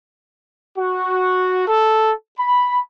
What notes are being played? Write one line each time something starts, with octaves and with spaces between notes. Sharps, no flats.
F#4
A4
B5